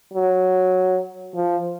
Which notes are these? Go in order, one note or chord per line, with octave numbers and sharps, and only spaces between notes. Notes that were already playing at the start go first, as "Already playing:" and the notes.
F#3
F3